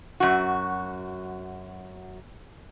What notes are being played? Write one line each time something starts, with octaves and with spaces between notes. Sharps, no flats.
F#2 F#4